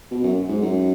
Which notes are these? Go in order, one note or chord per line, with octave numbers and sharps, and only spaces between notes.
B2
F#2
G#2
F#2